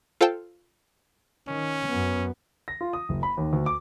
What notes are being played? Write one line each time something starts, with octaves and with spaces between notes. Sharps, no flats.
F4 A4 C5 F5 G5 A5
D#3 C#4
F#2 B3
A#6
F4
D#6
F#1
B5
D#2
D2
D6